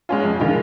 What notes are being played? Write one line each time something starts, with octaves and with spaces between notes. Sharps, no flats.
G#3 C#4 F4
F2
D#3 G#3 F4